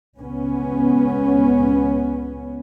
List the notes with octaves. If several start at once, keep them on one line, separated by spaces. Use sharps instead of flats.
C#2 B3 C#4